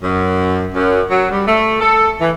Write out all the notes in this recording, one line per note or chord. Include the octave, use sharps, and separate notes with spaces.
F#2
F#2
F#3
G3
A3
A4
E3